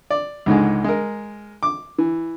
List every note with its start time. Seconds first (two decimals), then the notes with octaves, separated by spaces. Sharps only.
0.11 D5
0.46 C#2 G#2 D3 G#3
0.84 G#3 A#4
1.63 D6
1.98 E3